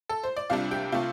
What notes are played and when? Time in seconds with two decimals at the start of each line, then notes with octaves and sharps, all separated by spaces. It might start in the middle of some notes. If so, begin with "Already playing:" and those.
0.09 A4
0.24 C5
0.37 D5
0.50 C2 C3 G3 D4 F4 F5
0.71 G4 G5
0.92 C3 A3 F4